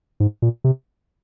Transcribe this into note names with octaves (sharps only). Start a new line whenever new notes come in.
G#2
A#2
C3